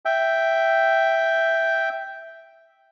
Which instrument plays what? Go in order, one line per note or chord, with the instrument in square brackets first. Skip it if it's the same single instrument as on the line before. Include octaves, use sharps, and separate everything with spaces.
[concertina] E5 G5